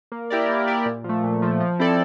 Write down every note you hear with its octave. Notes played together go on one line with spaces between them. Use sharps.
A#3
E4 G4 A#4 D5
A#3
E4 G4 A#4 D5
A#2
F3 A3
A#2
F3 A3
F3
C4 E4 A4 D5